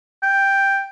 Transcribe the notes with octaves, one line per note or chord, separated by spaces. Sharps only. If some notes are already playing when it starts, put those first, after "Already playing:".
G5